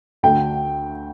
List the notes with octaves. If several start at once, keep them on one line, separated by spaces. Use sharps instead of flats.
D2 D3 A3 G5